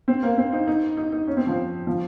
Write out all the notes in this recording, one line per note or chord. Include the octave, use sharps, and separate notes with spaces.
C4
A#3
C4
D#4
D#4
D#4
D#4
C#4
C4
F3
F3